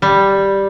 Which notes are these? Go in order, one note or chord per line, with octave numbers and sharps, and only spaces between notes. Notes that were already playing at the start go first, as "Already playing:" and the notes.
G3